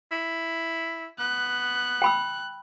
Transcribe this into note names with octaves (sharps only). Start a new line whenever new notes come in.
E4
B3 F#6
G5 B5 E6